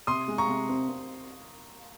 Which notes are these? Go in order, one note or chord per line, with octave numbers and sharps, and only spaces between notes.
C3 C6 D#6
G#3
A#5 C#6
C3
C4
C4